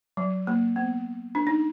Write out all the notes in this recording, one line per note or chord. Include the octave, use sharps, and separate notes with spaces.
F#3
A#3
B3
D4
D#4